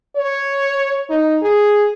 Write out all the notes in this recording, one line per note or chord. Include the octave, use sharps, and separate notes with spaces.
C#5
D#4
G#4